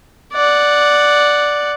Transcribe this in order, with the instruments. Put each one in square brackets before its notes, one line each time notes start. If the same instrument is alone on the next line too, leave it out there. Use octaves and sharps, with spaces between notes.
[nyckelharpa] D5 F#5